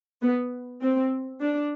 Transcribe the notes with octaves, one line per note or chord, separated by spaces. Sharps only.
B3
C4
D4